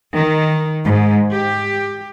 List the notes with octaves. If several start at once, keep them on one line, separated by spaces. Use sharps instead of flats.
D#3
G#2
G4